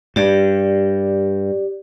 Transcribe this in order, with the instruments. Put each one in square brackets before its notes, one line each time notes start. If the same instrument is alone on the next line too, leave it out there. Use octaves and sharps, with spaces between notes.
[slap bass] G2 [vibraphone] G4 D5